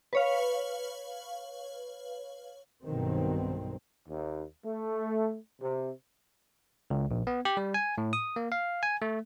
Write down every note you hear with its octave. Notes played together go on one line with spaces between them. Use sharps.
B4 C#5 F5
B1 G2 B2 D#3 C4
D#2
A3
C3
C#2
A#1
B3
G4
G3
G#5
A2
D#6
A#3
F5
G#5
A3